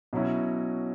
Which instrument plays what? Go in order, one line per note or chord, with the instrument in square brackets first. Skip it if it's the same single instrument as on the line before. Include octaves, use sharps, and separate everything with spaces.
[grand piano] B2 F#3 C#4 E4